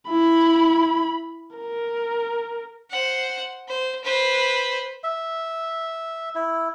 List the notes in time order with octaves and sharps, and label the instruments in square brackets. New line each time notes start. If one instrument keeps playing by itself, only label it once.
[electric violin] E4 B5
A#4
[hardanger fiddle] C5 F#5
C5
B4 C5
[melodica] E5
E4